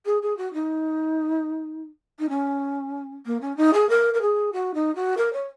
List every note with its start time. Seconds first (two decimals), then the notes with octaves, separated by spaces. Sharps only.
0.06 G#4
0.22 G#4
0.37 F#4
0.54 D#4
2.19 D#4
2.29 C#4
3.26 A#3
3.41 C#4
3.57 D#4
3.74 G#4
3.89 A#4
4.14 A#4
4.21 G#4
4.53 F#4
4.74 D#4
4.96 F#4
5.18 A#4
5.33 C#5